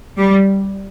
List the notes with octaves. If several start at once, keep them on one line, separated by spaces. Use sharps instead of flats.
G3